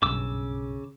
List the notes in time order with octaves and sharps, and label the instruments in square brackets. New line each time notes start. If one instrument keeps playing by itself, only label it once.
[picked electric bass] F#1 B1 G2 [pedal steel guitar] C#3 D6 E6